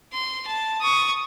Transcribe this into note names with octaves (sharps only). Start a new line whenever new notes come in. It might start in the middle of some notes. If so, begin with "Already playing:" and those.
C6
A5
C#6 D#6